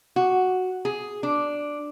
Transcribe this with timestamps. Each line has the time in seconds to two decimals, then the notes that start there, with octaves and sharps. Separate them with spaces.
0.16 F#4
0.85 G#4
1.23 D4